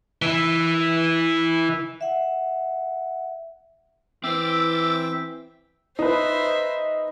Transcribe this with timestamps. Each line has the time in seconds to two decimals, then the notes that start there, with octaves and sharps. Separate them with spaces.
0.22 E3 E4
2.01 E5 F#5
4.24 E3 C4 C5 E5 G5 D6 E6 A6
5.99 D#4 B4 C5 D#5 E5